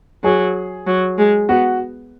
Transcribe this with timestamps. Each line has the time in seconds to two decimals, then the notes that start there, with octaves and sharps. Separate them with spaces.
0.24 F#3 G#4
0.87 F#3
1.18 G#3
1.49 B3 F#4